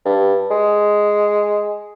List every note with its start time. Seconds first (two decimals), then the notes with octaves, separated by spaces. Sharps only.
0.05 G2
0.51 G#3